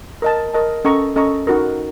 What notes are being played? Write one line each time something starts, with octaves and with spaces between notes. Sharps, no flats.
A#4 D#5 A5
A#4 D#5 A5
C#4 A4 D#5 A#5 C#6
C#4 A4 D#5 A#5 C#6
D#4 F#4 A#4